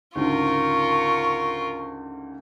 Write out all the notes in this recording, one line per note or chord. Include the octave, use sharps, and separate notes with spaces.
D2 G#2 C#3 F4 A#4 C#6